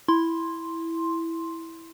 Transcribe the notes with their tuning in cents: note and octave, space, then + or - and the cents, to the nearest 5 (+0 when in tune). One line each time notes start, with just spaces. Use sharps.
E4 +0 C6 +5